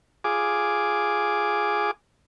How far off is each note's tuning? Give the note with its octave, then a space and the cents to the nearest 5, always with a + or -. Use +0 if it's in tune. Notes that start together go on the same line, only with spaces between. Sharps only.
F4 +0 G#4 +0 D6 +0